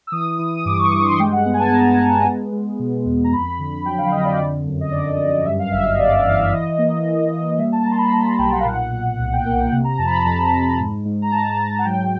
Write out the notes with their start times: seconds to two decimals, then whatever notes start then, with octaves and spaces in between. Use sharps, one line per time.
0.07 E6
0.12 E3 D#6
0.38 E3
0.57 D#6
0.65 G2 D6
0.79 C#6
0.92 G2 C#6
1.06 C6
1.19 G#3 G5
1.32 F#5
1.45 B3
1.54 G#5
1.60 A5
1.73 B3 A#5
1.99 B3
2.25 G#3
2.52 G#3
2.79 B2
3.05 E2
3.24 A#5
3.32 F2 B5
3.59 D3
3.85 F#3 G5
3.98 F5
4.12 F2 D#5
4.25 D5
4.39 D3
4.65 F#2
4.81 D#5
4.92 D3 D5
5.19 F#2
5.45 G2 E5
5.59 F5
5.72 G1 E5
5.85 D#5
5.98 G1 D5
6.25 E3 F5
6.39 E5
6.52 E3 D#5
6.78 A#3
7.05 A#3
7.32 A#3
7.50 D#5
7.58 G3 E5
7.72 A5
7.85 G3 A#5
7.92 C6
7.98 B5
8.11 G3 A#5
8.25 A5
8.38 B1 G5
8.52 F#5
8.60 F5
8.65 A#2 F#5
8.92 A#2
9.19 C2 F#5
9.33 G5
9.45 A#3 F#5
9.71 C3 F#5
9.84 A#5
9.98 F2 A5
10.07 B5
10.12 A#5
10.25 F2 A5
10.52 F2
10.79 G#2
11.05 G#2
11.22 A#5
11.32 G#2 A5
11.59 G#2
11.79 F#5
11.84 F#3 G5